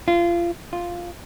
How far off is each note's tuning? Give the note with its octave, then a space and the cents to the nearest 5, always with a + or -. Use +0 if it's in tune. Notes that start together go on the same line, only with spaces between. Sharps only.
F4 -25
F4 +0